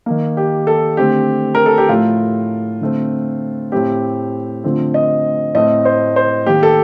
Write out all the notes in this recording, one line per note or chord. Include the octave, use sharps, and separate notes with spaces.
D#3 A#3
G4
A4
D3 A3 C4 G4
A#4
A4
G4
A2 F3 A3 F4
D3 A3 C4
A2 A3 C4 G4
D3 F3 A3 C4
D#5
A2 A3 C4 D#5
C5
C5
D#3 A#3 G4
A4